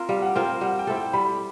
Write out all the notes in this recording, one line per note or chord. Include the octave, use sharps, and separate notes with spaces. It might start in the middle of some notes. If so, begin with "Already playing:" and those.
Already playing: C4 F4 A#4
G3 F5
F#5
C4 F4 A#4 G5
F5
G3 F#5
G5
C4 E4 A4
G5
G3 B5